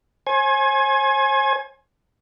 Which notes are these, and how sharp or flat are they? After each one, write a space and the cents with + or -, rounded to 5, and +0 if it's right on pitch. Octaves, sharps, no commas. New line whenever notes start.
C5 +45 G#5 +15